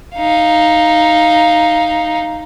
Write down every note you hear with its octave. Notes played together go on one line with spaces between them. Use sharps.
D#4 F5